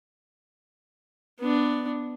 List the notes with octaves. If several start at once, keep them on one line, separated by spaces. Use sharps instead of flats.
B3 D4